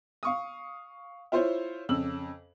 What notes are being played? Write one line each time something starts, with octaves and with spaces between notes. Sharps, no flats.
F5 C#6 D#6
E4 F4 C5 C#5
F2 C#3 E6 F#7